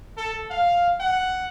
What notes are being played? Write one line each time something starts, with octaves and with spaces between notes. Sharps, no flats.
A4
F5
F#5